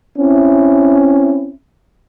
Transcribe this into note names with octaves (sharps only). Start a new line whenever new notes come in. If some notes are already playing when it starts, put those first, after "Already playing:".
C4 C#4 E4